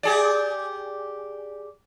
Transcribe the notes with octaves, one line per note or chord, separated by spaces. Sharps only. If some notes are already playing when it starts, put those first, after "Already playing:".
G4 G#4 D5